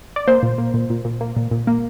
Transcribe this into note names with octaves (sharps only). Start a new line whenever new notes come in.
D5
A#3 C5
A#2
A#3
A#2
A#2
A#2
A#3
A#2
A#2
A#3